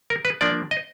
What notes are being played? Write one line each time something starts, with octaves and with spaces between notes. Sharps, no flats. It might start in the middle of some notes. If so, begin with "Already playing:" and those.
A#4
B4
F3 A#3 D4 D5
D#5